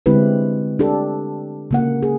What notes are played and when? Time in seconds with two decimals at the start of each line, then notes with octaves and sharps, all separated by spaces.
0.06 D3 G#3 C4 E4 G4 B4
0.79 D4 G4 A4
1.71 C#3 A#3 F#5
2.03 G#4